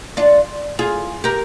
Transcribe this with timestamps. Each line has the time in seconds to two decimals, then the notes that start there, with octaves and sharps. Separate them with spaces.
0.17 D4 F4
0.79 F4 G#4
1.24 G4 A#4